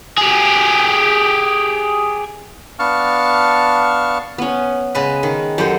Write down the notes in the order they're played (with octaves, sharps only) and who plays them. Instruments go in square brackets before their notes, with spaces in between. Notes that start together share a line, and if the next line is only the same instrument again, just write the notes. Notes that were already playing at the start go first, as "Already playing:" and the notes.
[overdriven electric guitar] G4 G#4
[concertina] B3 D4 F5 A5 C#6 F6
[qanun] B3 C#4
[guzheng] C#3 G#3 B4
D#3
[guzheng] F#2 C5 [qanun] G4 A4